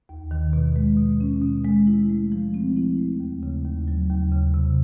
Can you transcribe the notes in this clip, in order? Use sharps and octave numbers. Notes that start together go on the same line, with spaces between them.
D#2
D#3
B2
G#3
B2
C#4
B2
G#3
E4
A3
F3
C4
E4
A3
D#2
C#3
D#2
F#3
D#2
C#3
C3